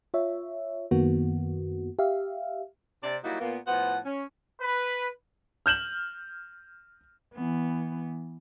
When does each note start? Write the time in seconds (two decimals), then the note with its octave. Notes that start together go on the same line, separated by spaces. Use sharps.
0.14 F4 C#5 E5
0.91 F#2 D#3 A#3 B3 F#4
1.99 G4 E5 F5
3.03 C3 D5
3.24 F#3 G3 A#3 D#4 E4 F#4
3.40 A#2 A#3 B3
3.67 A2 F3 B3 C5 F#5
4.06 C#4
4.61 B4
5.66 F6 G6 E7 F#7
7.34 E3 B3